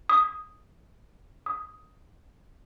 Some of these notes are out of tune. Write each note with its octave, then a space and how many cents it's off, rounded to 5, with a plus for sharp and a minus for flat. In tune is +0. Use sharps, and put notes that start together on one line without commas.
D#6 +0
D#6 +10